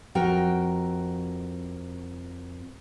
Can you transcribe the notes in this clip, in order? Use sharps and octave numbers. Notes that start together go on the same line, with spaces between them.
F2 F#4 A#4 G5